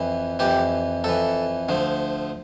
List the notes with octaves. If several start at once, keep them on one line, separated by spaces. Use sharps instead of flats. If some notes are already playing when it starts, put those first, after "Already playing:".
Already playing: F2 E3
F2 E3 G4
F2 E3 A4
D2 D3 F3